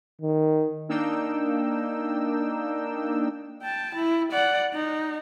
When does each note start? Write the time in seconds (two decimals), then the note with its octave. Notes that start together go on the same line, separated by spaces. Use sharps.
0.21 D#3
0.89 A#3 D4 D#4 G5 E6
3.62 G5 A5
3.95 E4
4.32 D5 F#5
4.74 D#4